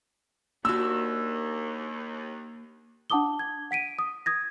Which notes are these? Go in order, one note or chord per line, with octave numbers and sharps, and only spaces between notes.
D#2 A#3 D4 F#4 E6
D4 F#5 A5 D6 D#6 G7
G#6
F#5 B6 D7 D#7
D#6
D#6 G#6 A#6